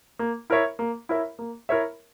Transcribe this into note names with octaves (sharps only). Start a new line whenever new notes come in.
A#3
E4 A#4 C#5 E5
A#3
E4 A#4 C#5 E5
A#3
E4 A#4 C#5 E5